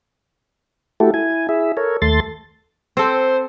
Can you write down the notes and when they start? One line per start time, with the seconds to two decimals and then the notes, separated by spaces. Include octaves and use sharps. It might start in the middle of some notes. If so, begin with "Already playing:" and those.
1.00 A3 E4 F#4 G4 A4
1.14 E4 G#5
1.49 E4 G#4 E5
1.77 A4 A#4 C#5
2.02 D#2 A3 A4 C6 A6
2.97 C4 A4 C5